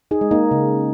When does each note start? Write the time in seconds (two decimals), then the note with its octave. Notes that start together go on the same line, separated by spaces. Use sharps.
0.11 D#4 G#4
0.21 G#3
0.31 A#3 D#4
0.51 C#3